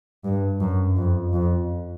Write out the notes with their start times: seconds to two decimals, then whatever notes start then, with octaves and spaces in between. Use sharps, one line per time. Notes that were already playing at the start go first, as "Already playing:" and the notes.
0.24 G2
0.60 F#2
0.97 F2
1.33 F2